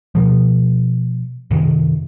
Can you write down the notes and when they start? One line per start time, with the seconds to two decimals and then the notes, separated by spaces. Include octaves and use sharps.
0.15 B2 F3
1.51 F#2 C3 D#3